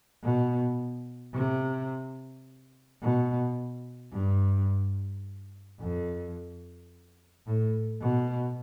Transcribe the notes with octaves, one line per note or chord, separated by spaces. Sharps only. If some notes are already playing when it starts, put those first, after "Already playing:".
B2
C3
B2
G2
F2
A2
B2